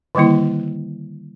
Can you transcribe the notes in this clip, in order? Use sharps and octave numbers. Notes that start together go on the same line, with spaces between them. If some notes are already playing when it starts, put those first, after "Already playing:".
D3 D#3 G3 A#3 E4